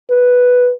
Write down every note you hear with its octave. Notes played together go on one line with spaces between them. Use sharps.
B4